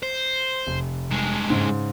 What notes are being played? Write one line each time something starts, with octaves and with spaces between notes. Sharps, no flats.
C5
F1
G2 G#3
G#2 C#3